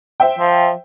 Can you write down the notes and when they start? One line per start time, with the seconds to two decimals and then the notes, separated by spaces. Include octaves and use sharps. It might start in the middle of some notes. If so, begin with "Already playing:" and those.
0.20 C5 E5 G5
0.39 F3